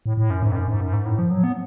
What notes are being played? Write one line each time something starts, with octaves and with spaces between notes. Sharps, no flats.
A2
A2
F#2
G#2
F2
F#2
G#2
F#2
G#2
A2
F3
F#3
B3